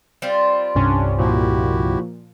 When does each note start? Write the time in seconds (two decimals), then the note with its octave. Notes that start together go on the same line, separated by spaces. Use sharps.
0.22 G3 C4 F4
0.75 G1 C2 G2 C3 C#4 D4
1.18 A#2 F3 E4 F#4 G4